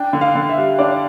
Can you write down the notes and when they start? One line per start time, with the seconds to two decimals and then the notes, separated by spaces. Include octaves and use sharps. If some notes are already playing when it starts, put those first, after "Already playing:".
Already playing: D4 G5
0.13 D3
0.21 F5
0.35 D3
0.49 E5
0.58 G3
0.79 D4 D5